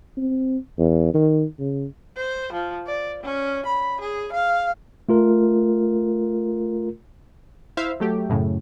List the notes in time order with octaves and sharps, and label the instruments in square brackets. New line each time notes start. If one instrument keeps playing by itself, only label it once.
[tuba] C4
E2
D#3
C#3
[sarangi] C5
F3
D5
C#4
B5
G#4
F5
[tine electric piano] A3 F4 A#4
[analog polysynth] E4 C5 E5 F5
F#3 A3 G4
F#2 A2 C#3